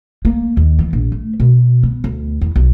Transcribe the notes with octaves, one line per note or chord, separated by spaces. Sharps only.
A#3
D#2
E3
A#1
A3
B2
B3
D2
E2
B1